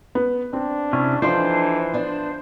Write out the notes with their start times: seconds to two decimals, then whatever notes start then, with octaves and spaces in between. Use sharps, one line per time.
0.15 B3
0.53 C4 D4
0.93 C3 C#4 E4
1.22 E3 F3 D4 D#4 A4 C5 C6
1.93 B3 D4